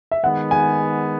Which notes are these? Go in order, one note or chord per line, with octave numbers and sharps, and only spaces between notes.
E5
D#3 G#3 B3 F#5
G#5